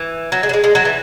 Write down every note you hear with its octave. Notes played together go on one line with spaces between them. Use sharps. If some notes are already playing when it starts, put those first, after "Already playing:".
Already playing: E3
F#3
G#3
F#3
G#3
G#3
F#3
E3